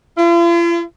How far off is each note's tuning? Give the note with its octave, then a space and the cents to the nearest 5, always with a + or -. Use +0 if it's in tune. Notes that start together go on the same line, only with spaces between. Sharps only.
F4 -45